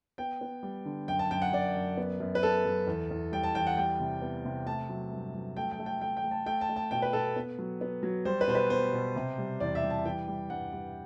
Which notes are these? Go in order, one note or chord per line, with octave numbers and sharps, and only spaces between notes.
B3 G5
B3
G3
D3
F#2 G5
A5
F#2 G5
F#5
F#2 D5
F#2
B3
F#2
B4
B3 A4
F#2
E2
E2
G3 G5
A5
E2 G5
F#5
G3 G5
C3
B3
C3
A3 A5
F#3
G2
F#3
A3 G5
G5
A3
G5
A3 G5
G5
A3
A5
A3 G5
A5
A3
A5
B2 G5
B4
B2 A4
B3
F#3
B3
F#3
G3 C5
B4
B2 C5
B4
B3 C5
B2
C3
G3
E2 D5
E5
G3
A5
E3 G5
G3
G2 F#5
G3